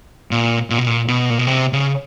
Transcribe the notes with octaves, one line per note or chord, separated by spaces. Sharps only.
A#2
A#2
B2
A#2
B2
A#2
B2
C3
C#3